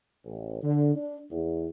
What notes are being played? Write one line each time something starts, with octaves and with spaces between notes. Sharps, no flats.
A1
D3
D4
E2